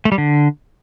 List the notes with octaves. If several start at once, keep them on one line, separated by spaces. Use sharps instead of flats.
A3
G3
D3